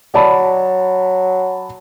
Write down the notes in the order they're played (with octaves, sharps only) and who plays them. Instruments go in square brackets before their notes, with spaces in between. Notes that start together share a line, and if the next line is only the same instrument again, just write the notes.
[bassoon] F#3 [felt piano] D5 A5 B5